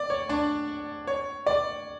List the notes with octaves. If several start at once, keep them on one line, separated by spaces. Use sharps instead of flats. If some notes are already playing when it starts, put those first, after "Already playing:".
Already playing: D5
C#5
D4
C#5
D5